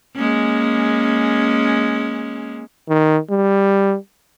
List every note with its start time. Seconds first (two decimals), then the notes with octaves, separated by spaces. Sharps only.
0.15 G#3 A#3 C#4
2.89 D#3
3.31 G3